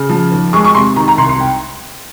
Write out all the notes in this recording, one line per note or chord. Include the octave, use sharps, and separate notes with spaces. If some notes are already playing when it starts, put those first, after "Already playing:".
Already playing: C#3
F3
D#2
G#3 C#6
C#6
C3 C6
D#3 A#5
A#5
C2 C6
C6
G5